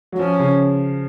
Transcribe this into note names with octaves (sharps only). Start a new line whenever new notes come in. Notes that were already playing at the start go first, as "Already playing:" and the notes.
F#3
F3 C#4
C#3